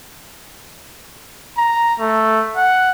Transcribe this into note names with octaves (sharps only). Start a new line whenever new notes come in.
A#5
A3
F#5